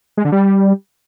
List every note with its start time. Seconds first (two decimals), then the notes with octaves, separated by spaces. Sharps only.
0.17 G#3
0.25 D3
0.32 G3